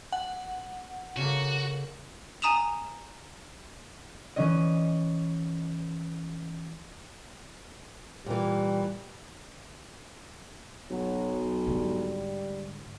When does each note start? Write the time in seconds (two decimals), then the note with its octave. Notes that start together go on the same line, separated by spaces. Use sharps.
0.12 F#5
1.17 C#3 A3 A#3 F#4
2.42 G#5 A#5 D#6 E7 F7
4.36 E3 C#4 D#5
8.26 A#2 E3 G3
10.90 B1 F#3
11.67 G#2 D3 G3